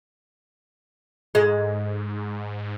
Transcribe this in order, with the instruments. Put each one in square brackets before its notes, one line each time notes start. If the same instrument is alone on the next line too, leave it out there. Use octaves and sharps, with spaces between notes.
[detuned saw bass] G#2 [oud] G#3